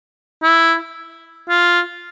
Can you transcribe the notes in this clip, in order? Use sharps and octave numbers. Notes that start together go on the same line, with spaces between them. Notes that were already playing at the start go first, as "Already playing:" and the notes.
E4
F4